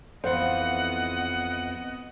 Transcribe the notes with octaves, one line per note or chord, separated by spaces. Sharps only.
F2 E3 B3 C5 D#5 F#5